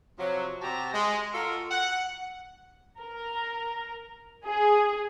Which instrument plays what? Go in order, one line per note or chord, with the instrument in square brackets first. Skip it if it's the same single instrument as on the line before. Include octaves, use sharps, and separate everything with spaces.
[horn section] C3 F3 F#3
C3 F#4 G4 A5 A#5
G#3
F4 F#4 A4 A#4
F#5
[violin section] A#4
G#4